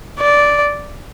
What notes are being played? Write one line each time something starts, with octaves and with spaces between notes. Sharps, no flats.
D5